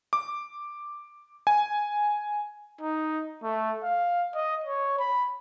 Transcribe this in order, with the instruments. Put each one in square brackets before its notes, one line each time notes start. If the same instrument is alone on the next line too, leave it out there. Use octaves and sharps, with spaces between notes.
[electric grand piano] D6
G#5
[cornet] D#4
A3
F5
D#5
C#5
B5